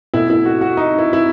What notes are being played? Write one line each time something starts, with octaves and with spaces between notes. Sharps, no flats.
B2 A3 E4
E4
F#4
F#4
D#4
E4
E4